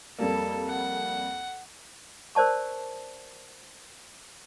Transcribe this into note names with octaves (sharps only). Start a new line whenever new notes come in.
F2 G3 A#3 A4
F#5
A#4 C5 D5 A5 C#6